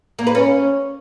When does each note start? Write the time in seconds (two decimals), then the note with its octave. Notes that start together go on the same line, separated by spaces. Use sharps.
0.19 A#3
0.27 B4
0.35 C#4